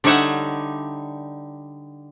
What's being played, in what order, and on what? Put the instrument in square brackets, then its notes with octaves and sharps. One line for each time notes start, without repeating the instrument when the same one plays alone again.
[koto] D3 G3 D#4 C#5 E5 F#5